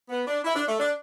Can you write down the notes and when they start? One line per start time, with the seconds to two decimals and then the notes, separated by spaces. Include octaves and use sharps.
0.09 B3
0.27 D4
0.44 E4
0.55 D4
0.67 A3
0.79 D4